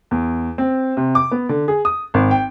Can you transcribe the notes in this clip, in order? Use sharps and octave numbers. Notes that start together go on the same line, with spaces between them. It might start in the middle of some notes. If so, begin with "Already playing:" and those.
E2
C4
C3
D6
B3
D3
G#4
D#6
G#1
G5